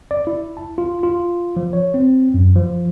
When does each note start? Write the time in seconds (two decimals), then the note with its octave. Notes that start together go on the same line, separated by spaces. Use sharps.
0.11 D5
0.27 E4
0.57 A5
0.78 F4
1.03 F4
1.56 F3
1.73 C#5
1.94 C4
2.34 F#2
2.56 F3